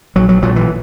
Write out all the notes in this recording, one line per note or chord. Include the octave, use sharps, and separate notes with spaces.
A#1 F#3
F#3
A#2 F#3
E3